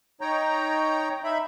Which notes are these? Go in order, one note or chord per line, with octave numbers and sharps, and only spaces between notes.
D#4 C#5 G5 A#5
D#4 E5 B5